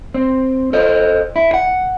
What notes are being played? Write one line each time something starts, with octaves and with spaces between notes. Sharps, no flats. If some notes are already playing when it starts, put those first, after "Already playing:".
C4
A4 C5 D#5
E4
F#5